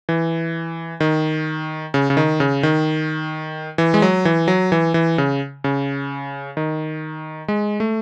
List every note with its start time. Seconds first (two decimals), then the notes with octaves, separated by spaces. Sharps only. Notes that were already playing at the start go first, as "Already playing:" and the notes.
0.09 E3
1.00 D#3
1.94 C#3
2.10 C#3
2.17 D#3
2.40 C#3
2.63 D#3
3.78 E3
3.94 G#3
4.02 F#3
4.25 E3
4.48 F#3
4.72 E3
4.94 E3
5.18 C#3
5.64 C#3
6.57 D#3
7.48 G#3
7.80 A3